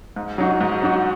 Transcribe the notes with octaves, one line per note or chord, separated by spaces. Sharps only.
G#2
F#3 D#4 F#4
G#2
F#3 D#4 F#4